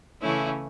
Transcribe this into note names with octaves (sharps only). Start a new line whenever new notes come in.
C#3 E3 A3 C#4 E4